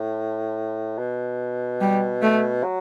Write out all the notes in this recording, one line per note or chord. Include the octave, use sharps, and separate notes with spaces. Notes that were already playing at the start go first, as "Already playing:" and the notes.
Already playing: A2
B2
G3
A3
F#3